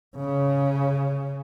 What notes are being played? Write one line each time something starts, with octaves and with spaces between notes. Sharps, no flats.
C#3